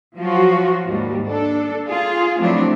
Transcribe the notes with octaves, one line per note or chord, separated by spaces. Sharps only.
F3 F#3 F4 F#4
D#2 G#2 G3
D4 A4
F4 G#4
F3 F#3 A3 C4 D4 E4